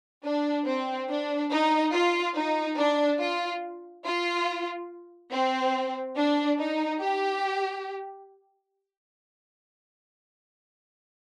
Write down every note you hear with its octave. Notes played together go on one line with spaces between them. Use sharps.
D4
C4
D4
D#4
F4
D#4
D4
F4
F4
C4
D4
D#4
G4